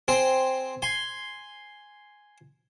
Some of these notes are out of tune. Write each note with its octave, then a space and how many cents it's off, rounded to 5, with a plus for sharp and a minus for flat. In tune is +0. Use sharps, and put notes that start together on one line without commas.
C4 +0 G#4 +0
G#5 +0 C6 +0